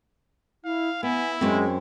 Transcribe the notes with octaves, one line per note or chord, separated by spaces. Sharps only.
E4 F5
B3 E4 G#5
F#2 G#3 C4